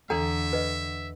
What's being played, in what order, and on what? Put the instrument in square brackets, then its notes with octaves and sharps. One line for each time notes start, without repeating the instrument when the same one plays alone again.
[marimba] E2 E3 [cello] D3 [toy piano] A4 G5 A#5 [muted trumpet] E5
[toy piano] B4 D#5